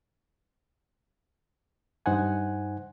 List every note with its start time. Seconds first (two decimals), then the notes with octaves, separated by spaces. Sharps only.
2.06 G2 D#4 C5 F#5 G#5